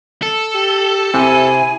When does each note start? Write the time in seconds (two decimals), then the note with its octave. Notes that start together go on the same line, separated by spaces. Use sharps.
0.23 A4
0.55 G4
1.14 C3 E4 G#5